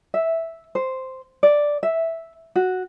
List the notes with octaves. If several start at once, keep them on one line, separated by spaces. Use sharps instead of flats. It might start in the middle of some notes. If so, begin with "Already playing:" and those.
E5
C5
D5
E5
F#4